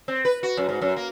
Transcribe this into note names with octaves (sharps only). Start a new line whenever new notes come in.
C4
B4
F#4
F#2
G#2
F#2
A#3